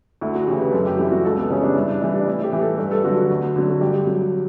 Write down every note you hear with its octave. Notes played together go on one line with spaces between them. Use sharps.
D2 E4
F#4
C#3 E3 G4
B4
F#2 A4
G4
E3 G3 E4
F#4
C#2 A4
B3
C#3 E3 G3 C#4
D4
G2 E4
D4
E3 G3 E4
D4
A2 E4
G4
E3 G3
A4
G2 B4
A4
D3 F#3 F#4
F#4
D2
D3 F#3
F#4
G2 G4
F#3